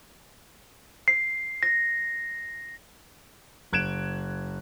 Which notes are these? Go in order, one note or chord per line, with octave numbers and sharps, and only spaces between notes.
C7
A#6
F#1 F#6 G#6 D7 E7